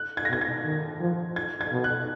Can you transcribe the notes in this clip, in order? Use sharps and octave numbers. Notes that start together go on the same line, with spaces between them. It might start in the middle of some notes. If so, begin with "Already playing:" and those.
Already playing: F#6
G#6
A#6
B2 G#6
G#6
D#3
F3
G#6
G#6
B2
F#6